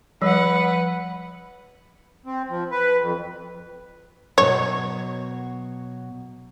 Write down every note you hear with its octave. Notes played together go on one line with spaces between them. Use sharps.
F3 G3 B4 F#5
C4
F3
B4
F2
B2 F#3 C#5